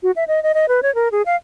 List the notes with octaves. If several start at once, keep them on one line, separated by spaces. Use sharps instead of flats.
F#4
E5
D#5
D#5
D#5
B4
C#5
A#4
G#4
F5